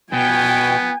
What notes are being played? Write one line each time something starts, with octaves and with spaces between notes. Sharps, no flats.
B2 B3 G5 G#5